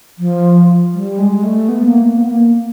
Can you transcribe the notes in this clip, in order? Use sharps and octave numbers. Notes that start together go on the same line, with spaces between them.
F3
G3
G#3
A3
B3
A#3
A#3
B3
A#3